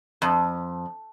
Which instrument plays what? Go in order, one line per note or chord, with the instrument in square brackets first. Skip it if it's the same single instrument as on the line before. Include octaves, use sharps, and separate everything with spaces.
[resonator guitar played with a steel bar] F2